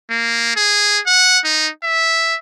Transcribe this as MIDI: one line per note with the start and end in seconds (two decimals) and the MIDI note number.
0.10 0.52 58
0.56 1.00 68
1.06 1.39 78
1.44 1.70 63
1.83 2.36 76